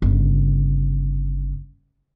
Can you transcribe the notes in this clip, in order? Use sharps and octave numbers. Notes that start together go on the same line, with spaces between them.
G1 C#3